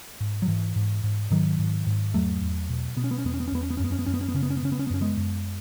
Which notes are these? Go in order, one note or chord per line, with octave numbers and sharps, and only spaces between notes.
G#2
F#3
G#2 E3
G#2
G#2
G#2 D#3 F#3
G#2
G#2
E2 F#3 A3
E2
B2
B2 B3
C#4
B3
C#4
E2 B3
C#4
B3
C#4
E2 B3
C#4
B3
F#2 C#4
B3
C#4
B3
F#2 C#4
B3
C#4
B3
C#3 C#4
B3
C#4
B3
C#3 C#4
B3
C#4
B3
F#2 C#4
G#3 B3
F#2